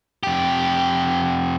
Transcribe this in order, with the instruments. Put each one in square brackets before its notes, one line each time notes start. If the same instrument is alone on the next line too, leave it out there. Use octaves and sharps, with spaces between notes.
[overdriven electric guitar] F2 G4